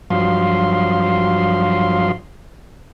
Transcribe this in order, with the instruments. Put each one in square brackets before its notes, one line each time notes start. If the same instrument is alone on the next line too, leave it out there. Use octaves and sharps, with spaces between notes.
[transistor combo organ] G2 F3 F#3 F5 C6